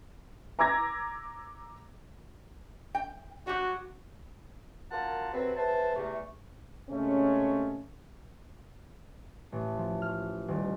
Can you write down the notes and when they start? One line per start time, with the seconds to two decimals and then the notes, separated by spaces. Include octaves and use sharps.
0.59 A#5 D6 E6 G#6 A#6
2.95 G5
3.47 F#3 F#4 G4
4.91 F#2 A#3 F4 F#5 A5
5.33 C3 F#3 C4 A4 B4
5.57 C#2 B4 C5 E5 A5
5.96 E2 C3 A3
6.90 C3 G#3 A3 C#4
9.52 A1
9.77 F3
10.02 F6
10.48 D#1